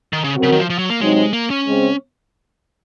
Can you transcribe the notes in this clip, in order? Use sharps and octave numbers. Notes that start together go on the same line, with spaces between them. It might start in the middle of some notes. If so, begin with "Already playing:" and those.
D#3
C#3
F#3 C4 F#4 A#4
C#3
D#3
F3
F3
F#3
A#3
C3 F#3 G#3 C4 D#4
A#3
C#4
C#3 G#3 C4